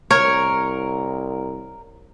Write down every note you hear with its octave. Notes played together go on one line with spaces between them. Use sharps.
C2 A#4 C#5